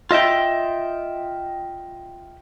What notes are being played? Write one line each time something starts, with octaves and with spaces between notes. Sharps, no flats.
F4 D#5 E5 G5